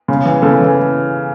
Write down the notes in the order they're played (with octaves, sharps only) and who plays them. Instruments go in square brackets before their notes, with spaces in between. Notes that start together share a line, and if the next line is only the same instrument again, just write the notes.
[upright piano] C#3
E3
C#3 A4
E3